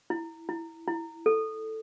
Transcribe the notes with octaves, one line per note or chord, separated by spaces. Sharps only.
E4
E4
E4
A4